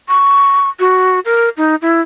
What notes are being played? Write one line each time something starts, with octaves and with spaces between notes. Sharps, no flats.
C#6
F#4
A#4
D#4
E4